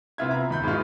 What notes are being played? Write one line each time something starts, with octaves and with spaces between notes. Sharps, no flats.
C3 B3 E4 F4 E5 G#6
A#5
D#2 B5 G6
G#2 B2 E3 G#3 F4